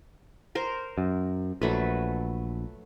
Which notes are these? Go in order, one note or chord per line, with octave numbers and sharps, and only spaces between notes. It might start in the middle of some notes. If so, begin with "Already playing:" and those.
A#4 C5
F#2
A#1 F#3 A3 B4